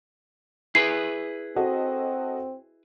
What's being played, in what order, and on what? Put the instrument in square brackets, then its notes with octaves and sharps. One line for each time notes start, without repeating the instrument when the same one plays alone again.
[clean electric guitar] E4 G#4 B4 [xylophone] C7
[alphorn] C4 [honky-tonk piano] F#4 A4 D#5